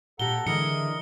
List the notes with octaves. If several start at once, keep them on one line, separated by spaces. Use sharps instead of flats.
A#2 G4 A4 F#5 A#5 G7
D3 E3 G#3 E4 A#4 D#5 C#7